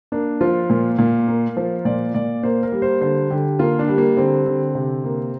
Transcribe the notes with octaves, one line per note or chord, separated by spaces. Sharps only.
A#3 D4
F3 F4
A#2
A#2
A#3
F3
A#2 D5
A#2 D5
A#3 C5
A#4
G3
C5
D3 C5
D3 G4
A#3 F4
D4
G3
A#3
D3 C4
D3
C3
A#3